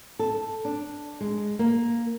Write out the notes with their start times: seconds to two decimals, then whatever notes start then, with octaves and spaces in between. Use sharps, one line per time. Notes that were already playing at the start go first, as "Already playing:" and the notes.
0.19 A4
0.65 D4
1.21 G#3
1.59 A#3